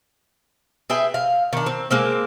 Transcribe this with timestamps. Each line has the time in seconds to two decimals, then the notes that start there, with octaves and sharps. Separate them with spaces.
0.90 G#4 B4 E5 G5
1.14 F5
1.53 D#3 D4
1.66 C4
1.91 G#3 A#3 C4